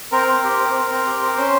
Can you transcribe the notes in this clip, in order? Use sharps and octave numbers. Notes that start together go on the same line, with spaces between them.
C4 A#4
C4
G4
C4
C4
C4
G4
C4
C#4 C5